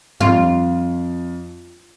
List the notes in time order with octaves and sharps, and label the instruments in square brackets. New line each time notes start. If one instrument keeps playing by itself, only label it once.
[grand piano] F2 [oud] F4